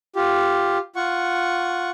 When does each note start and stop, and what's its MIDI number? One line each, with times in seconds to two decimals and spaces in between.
0.16 0.78 65
0.16 0.78 67
0.96 1.90 65
0.96 1.90 78
0.96 1.90 85